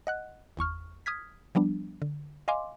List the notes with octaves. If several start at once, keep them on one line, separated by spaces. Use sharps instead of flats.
D#5 F#5 F#6
G1 E2 C#6 F6
D#6 F6 G#6 B6
F3 G3 B3 D4
D3
D#5 F5 G#5 C6 D6